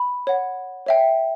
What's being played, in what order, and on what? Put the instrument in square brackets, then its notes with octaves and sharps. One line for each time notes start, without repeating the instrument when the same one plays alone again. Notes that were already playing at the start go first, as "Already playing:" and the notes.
Already playing: [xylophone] B5
C#5 F#5
C#5 E5 G5